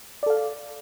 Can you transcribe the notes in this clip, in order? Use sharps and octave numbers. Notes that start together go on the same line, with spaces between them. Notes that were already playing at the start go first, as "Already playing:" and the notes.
A4 D5 F5